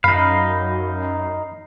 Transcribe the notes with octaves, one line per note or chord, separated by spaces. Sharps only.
F#2 D#4 F5 B5